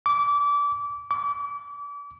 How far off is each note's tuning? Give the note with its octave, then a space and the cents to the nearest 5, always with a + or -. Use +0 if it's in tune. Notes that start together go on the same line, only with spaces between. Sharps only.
D6 -25
D6 -35